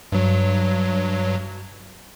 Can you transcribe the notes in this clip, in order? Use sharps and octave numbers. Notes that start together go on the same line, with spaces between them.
G2 F#3